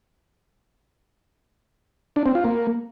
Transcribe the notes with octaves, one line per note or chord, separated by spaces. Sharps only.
D4
C4
F4
A#3